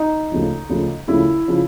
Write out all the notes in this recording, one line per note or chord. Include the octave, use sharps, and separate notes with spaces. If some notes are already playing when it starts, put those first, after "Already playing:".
Already playing: D#4
D2 C#3 F3
D2 C#3 F3
D2 C#3 F3 E4
C#3 F3